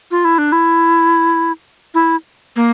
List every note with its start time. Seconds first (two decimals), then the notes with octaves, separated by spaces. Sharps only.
0.11 F4
0.25 E4
0.38 D4
0.52 E4
1.94 E4
2.56 A#3